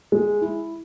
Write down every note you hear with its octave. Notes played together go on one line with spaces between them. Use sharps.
G#3
E4